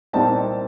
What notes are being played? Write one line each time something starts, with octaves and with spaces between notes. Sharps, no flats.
C2 A#2 G3 C4 D#4 G5 A5